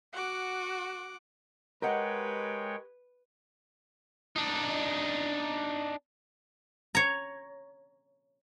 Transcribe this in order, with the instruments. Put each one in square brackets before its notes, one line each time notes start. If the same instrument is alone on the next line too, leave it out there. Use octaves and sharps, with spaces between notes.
[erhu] F#4 [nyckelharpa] F#5 D6
[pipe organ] G#3 C#5 G5 [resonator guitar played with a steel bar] G4 D#5 F#5 [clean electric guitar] A#4 [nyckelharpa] B4
[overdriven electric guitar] D4 D#4
[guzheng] C#5 A#5